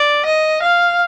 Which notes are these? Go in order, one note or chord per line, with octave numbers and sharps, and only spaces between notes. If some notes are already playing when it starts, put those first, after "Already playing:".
Already playing: D5
D#5
F5